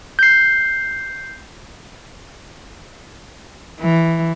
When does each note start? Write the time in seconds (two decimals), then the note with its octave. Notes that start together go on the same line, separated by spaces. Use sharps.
0.19 G6 C7
3.80 E3